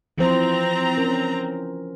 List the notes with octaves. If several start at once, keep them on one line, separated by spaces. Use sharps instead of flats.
E3 F3 C4 C5 A#5
C#4 A#4